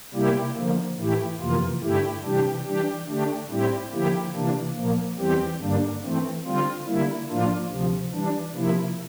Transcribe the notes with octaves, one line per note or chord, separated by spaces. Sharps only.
C3 G3 A#3 E4 G4
D3 F3 A#3
A2 E3 A3 E4 G4
F2 C3 E3 A#3 F4
G2 D3 A3 E4 G4
C3 E3 G3 D4 G4
E3 G3 D4 G4
D3 A3 D4 G4
A2 G3 C4 E4 G4
D3 F3 A#3 E4 G4
C3 E3 A#3 D4
A#2 F3 A#3
E2 E3 G3 C4 G4
G2 D3 G3 A#3 D4
E3 A3 C4
D3 G3 C4 F4
D3 G3 A#3 E4
A2 F3 A#3 D4 F4
D2 C3 F3
E3 G3 D4
C3 F3 A#3 E4